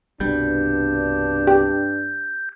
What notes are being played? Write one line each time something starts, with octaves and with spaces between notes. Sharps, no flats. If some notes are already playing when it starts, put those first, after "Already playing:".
C2 G2 B2 G3 D4 G6
G4